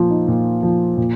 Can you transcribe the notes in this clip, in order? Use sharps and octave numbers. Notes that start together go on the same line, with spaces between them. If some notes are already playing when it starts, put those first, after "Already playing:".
Already playing: A#2 F3 F4
D#4
A#2
F3
A#2